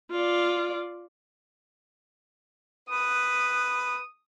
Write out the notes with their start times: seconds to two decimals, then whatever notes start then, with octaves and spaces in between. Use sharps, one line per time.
0.11 F4 D5
2.89 B4 D#6